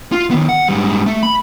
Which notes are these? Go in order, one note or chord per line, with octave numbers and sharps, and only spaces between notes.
F4
D#3 B3
F#5
G#2 G3
A3
B5